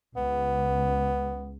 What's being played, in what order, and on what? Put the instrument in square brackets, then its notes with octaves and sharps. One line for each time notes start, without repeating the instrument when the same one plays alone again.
[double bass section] C#2 [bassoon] B3